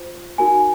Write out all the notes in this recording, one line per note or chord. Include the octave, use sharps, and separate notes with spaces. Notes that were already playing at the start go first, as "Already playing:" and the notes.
Already playing: F4 C5
D#4 F#4 A#4 G#5